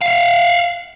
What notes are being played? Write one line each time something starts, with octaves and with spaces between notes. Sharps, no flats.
E5 F5